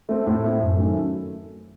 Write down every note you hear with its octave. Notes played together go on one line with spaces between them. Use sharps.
A3 C4
A2
A3 C4
F#2
D#3 F#3 A3 C#4